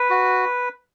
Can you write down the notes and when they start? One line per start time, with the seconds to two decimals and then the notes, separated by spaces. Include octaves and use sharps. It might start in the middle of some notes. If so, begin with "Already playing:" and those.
Already playing: B4
0.10 F#4